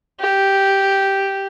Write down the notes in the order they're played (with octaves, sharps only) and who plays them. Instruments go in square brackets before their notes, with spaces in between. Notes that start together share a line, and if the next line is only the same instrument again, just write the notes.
[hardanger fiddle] G4